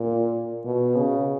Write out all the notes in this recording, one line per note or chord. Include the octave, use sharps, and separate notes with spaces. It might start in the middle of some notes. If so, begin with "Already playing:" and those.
Already playing: A#2
B2
C#3